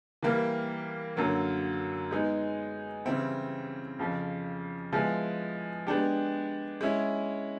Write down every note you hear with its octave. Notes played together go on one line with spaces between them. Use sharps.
E3 G3 A#3
F#2 D3 F#3 A#3
G#3 B3 D#4 G#4
C#3 E3 G3 C4 E4
F2 C#3 F3
F3 G#3 B3 E4 G#4
G#3 B3 D4 G4
G#3 C#4 E4